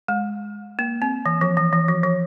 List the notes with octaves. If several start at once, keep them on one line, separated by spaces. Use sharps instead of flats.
G#3
A#3
C4
E3
F3
E3
E3
F3
F3